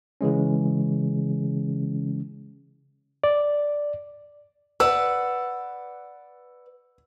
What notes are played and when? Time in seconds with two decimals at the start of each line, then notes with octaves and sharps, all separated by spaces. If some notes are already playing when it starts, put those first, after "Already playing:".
0.21 C#3 E3 G#3 C#4
3.24 D5
4.80 B4 D5 F#5 E6